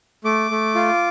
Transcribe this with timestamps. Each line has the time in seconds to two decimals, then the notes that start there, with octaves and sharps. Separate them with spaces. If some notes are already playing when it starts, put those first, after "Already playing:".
0.24 A3 D6
0.51 A3
0.75 F4